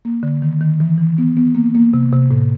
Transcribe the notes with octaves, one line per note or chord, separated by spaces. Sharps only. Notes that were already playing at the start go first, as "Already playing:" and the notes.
A#3
D3
D#3
D#3
E3
E3
B3
B3
A#3
A#3
C3
C3
A2